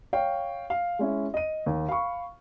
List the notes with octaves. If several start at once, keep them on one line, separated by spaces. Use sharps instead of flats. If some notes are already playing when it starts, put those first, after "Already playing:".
C#5 F5 G5
F5
G#3 C#4 E4
D#5 D#7
D#2
F5 B5 C#6